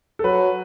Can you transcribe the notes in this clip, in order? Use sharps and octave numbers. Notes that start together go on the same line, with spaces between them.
A4
F#3 B4